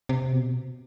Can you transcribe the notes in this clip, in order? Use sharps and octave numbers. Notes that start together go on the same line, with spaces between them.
C3
B2